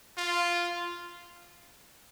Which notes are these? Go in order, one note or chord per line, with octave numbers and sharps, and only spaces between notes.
F4